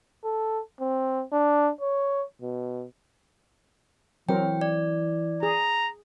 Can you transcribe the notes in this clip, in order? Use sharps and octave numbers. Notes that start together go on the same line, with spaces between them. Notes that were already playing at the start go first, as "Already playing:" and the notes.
A4
C4
D4
C#5
B2
E3 F#3 C4 A#4 G5
D5
G#4 A#5